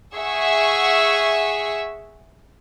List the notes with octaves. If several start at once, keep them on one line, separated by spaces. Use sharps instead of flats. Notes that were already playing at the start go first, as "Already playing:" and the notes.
G#4 E5 F#5 C#6 E6